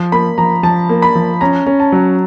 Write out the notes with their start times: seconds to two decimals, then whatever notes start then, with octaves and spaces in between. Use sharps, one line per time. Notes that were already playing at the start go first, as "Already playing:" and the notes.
Already playing: F3
0.12 A#3 B5
0.38 F3 A#5
0.63 F3 A5
0.89 A#3
1.02 B5
1.15 F3
1.41 C#4 A#5
1.66 C#4
1.80 A5
1.92 F#3